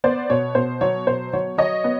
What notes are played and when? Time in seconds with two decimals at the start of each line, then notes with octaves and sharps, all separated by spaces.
0.04 B3 C5 D5
0.30 B2 C#5
0.55 B2 C5
0.81 F#3 C#5
1.07 B2 C5
1.33 F#3 C#5
1.58 F#3 C#5 D#5
1.84 B3